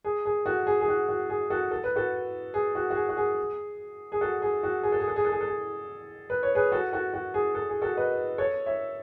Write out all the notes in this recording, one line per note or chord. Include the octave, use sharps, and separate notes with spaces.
G#4
G#4
F#4 A4
G#4
G#4
F#4
F#4
G#4
F#4 A4
A4
B4
F#4 A4
G#4
F#4
F#4
G#4
F#4
G#4
G#4
F#4 A4
G#4
F#4
G#4
A4
G#4
A4
G#4
A4
G#4
A4
G#4
B4
C#5
G#4 B4
F#4 A4
F#4 A4
F#4
G#4
A4
G#4
F#4 A4
B4 D#5
A4 C#5
C#5 E5